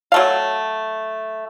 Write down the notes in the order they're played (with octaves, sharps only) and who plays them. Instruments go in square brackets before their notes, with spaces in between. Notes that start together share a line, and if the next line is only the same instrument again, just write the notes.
[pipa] F#3 A3 F5